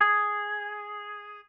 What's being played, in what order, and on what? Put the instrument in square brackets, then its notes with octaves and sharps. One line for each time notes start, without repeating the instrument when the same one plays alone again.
[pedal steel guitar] G#4